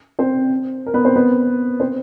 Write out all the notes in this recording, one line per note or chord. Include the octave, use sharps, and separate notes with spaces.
C4 C5
A#4
B3 B4
C4 C5
B3 B4
C4 C5